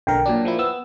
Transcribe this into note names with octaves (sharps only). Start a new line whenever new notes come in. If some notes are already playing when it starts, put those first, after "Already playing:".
B1 D3 A#4 G5
A#2 F#3 D4
F3 A#3 E4
B3 E6